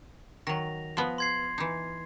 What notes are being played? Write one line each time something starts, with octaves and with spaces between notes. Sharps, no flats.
D#3 F#3 A#6 F7
F3 B3
C6 G#6 C7
E3 D#4